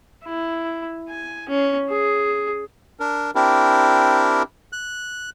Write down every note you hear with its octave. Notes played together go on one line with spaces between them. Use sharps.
E4
G#5
C#4
G#4
D4 A#4
C4 D4 E4 G4 A#4
F#6